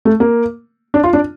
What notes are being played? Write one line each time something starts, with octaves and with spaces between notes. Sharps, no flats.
A3
A#3
D4
F4
D4